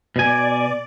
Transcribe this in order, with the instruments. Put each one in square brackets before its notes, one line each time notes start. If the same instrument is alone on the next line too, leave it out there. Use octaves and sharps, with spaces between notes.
[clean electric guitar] B2 G#5 [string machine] D5